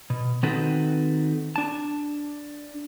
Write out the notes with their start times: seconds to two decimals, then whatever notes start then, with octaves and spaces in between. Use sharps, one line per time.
0.10 B2
0.43 D#3 C4 D#4 F#4 A4 B4
1.56 D4 A5